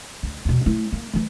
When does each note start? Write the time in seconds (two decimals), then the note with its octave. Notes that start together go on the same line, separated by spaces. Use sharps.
0.23 D2
0.45 E2 B2
0.66 A3 E4
0.92 A#3
1.13 E3 A3